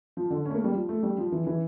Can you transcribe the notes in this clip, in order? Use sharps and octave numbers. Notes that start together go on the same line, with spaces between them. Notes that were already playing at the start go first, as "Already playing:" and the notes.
F3
D3
C#4
A3
A#3
G3
F3
A3
G3
F3
E3
E3